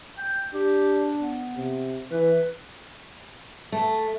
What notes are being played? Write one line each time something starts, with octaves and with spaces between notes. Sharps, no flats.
G5
D4 G4
B3
C3
E3 B4
A3